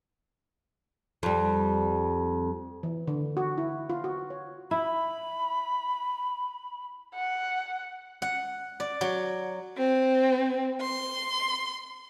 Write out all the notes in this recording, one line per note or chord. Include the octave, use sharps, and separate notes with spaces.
F2 G3
E3
D3
F#4
E4
F4
F#4
C#5
E4 B5
F#5
F#5
D5
F#3
C4
C6